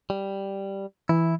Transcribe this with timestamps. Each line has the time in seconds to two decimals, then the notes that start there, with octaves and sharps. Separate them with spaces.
0.10 G3
1.09 E3 E4